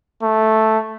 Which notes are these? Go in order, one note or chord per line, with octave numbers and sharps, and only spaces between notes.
A3